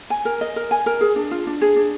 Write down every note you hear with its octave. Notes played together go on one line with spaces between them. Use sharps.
G#5
A#4
D#5
A#4
G#5
A#4
G#4
D4
F4
D4
G#4
D4